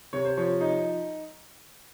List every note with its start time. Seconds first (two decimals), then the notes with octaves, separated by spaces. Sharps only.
0.13 C3 C#5
0.25 C5
0.37 F3 C#5
0.61 D#4